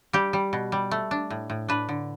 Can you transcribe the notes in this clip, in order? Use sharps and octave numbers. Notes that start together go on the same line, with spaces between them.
G3 G4
G3
B2
G3
A3
D4
A2
A2
D4 B4
D3